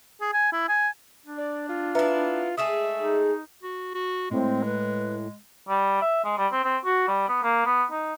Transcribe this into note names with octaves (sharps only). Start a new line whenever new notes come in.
G#4
G#5
E4
G#5
D4
D5
F4
B3 E4 B4 E5 A#5
G#3 A3 G#4 E5 D#6 E7
D#4
F#4
F#4
A2 G#3 C4
B4
G3
E5
G#3
G3
C4
C4
F#4
G3
B3
A#3
B3
D#4